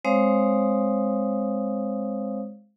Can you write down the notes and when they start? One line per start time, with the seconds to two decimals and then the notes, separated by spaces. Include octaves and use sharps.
0.05 G#3 C4 C5 C#5 F5 D#6